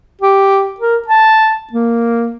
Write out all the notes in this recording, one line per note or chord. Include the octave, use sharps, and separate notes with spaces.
G4
A#4
A5
A#3